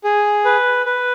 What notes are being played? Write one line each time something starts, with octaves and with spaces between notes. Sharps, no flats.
G#4
B4
B4